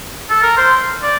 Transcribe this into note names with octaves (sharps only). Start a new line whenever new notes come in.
A4
A#4
C5
D5